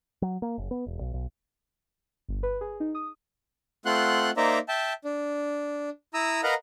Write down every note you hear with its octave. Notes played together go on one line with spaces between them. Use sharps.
F#3
A#3
F#1
B3
E1
B1
B1
G1
B4
G#4
D#4
D#6
A3 C4 F4 F#5 C6 F#6
A#3 D#4 C5 D5 E5 A#5
E5 G5 A5
D4
E4 A#5 D#6 E6
A#4 B4 D#5 F5 F#5 A#5